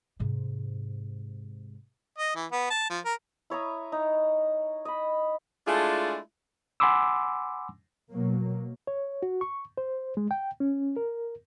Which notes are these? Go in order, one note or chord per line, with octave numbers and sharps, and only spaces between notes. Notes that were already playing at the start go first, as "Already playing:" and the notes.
G#2 C3
D#5
E3
B3
A5
F3
A#4
E4 C#5 A#5 D#6
D#4
D#5 B5
G#3 A3 D4 E4 F4 G#4
F#5 G#5 B5 C6 D6 E6
B2 F#3 A#3
C#5
F#4
C#6
C5
G#3
G5
C#4
A#4